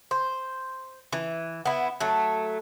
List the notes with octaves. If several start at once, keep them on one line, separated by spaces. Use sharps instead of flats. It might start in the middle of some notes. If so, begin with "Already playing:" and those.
C5
E3
B3 E4
F#3 A3